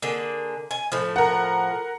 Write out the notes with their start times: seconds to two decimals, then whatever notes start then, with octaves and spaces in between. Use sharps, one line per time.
0.02 D3 A#3 G#4
0.71 G#5
0.92 A2 F3
1.16 A#4 F#5